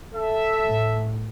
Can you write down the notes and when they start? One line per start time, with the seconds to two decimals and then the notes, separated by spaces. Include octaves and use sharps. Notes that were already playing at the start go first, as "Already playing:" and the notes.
0.15 A4 E5
0.64 A2